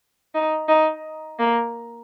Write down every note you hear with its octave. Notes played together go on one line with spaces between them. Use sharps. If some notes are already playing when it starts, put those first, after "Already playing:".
D#4
D#4
A#3